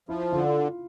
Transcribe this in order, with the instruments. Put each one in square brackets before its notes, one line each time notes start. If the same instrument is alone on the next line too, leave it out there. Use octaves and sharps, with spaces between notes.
[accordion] F3 [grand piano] E4
[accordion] D3 [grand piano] F4